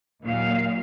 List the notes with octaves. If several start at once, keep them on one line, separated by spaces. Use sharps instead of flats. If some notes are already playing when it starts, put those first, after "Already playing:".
D#2 A#2 F#3 F5